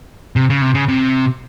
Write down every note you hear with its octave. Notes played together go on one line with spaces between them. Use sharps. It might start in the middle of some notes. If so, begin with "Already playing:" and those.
C3
C#3
C3
C#3
C3